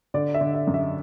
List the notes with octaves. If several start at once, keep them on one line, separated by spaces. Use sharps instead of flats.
D3 D5
E5
D3
E5
F#2
E5